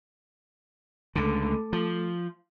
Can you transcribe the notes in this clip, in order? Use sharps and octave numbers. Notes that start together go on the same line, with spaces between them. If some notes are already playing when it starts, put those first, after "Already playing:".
C#2 D3 A3 A4 D6
F3